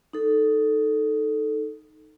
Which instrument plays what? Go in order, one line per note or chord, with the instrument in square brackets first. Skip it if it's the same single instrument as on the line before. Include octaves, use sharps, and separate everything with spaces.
[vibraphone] D#4 A4